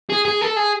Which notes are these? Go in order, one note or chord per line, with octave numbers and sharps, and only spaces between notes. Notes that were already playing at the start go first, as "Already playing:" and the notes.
G#4
G#4
A4
G#4